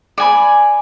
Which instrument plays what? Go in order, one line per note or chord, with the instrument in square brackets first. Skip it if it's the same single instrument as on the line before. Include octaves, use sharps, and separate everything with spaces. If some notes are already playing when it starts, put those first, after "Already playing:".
[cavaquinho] D5 G#5 B5